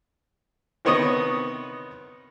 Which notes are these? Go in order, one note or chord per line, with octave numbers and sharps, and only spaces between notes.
C3 D#3 B3 C#5 D#5 D#6